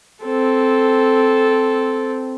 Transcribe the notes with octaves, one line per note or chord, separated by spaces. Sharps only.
C4 A4